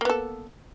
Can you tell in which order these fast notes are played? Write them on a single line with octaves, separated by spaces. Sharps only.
A#3 B3 A4